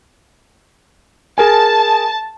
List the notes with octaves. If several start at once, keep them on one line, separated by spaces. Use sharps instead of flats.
G#4 A#4 G#5 A5